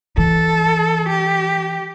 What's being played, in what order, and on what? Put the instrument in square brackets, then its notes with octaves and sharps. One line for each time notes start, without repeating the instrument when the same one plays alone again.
[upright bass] E3 [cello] A4
[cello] G4